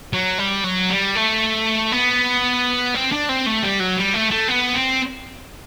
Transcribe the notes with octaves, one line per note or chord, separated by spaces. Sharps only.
F#3
G3
F#3
G3
A3
B3
C4
D4
C4
A3
G3
F#3
G3
A3
A3
B3
C4